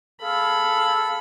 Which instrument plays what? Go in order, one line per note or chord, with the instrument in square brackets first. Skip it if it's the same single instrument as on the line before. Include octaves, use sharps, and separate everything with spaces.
[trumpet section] G#4 A4 F5 [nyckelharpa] B5